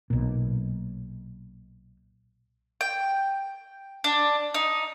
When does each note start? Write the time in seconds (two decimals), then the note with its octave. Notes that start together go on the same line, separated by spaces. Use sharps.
0.10 B1 A#2
2.81 G5
4.04 D4
4.54 D#4